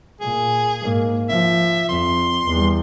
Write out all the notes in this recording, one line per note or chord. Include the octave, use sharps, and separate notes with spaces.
A#2 G#4
G#2 A#3
F3 E5
F2 C6
E2 G3